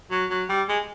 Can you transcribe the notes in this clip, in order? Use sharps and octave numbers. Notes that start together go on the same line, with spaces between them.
F#3
F#3
G3
G#3